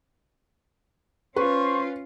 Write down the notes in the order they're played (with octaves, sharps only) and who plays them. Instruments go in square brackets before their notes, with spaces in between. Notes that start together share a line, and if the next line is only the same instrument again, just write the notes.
[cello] C#4 F4 [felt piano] B4 [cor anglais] C5 [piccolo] C#6